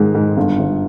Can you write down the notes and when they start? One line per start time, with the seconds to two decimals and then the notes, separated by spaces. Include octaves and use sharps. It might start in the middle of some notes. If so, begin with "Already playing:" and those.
Already playing: G#2 D#3 G#3
0.14 G#2
0.37 G1
0.59 G1